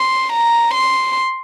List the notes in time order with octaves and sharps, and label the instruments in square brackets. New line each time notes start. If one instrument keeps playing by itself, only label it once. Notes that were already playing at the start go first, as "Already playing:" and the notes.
Already playing: [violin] C6
A#5
C6